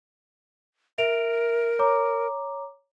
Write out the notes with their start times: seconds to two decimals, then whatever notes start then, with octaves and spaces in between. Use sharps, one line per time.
0.98 A#4 E5 D7 F7
1.79 C#5 A#5 D6